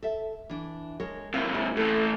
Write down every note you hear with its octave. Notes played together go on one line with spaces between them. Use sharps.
A4 E5
E3 D4
G#3 A#4 C#5
D#2 C3 E4 F5
E4 G#4
A2 E3 A4